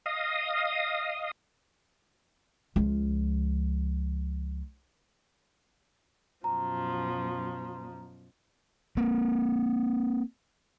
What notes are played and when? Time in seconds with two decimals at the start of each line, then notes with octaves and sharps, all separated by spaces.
0.06 D#5 F5 D#6
2.76 C#2 F3
6.44 F#2 B2 F3 A#5
8.97 A#3 C4